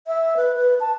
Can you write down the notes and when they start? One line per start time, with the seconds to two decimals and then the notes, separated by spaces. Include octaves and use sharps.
0.07 E5
0.37 B4
0.55 B4
0.80 A5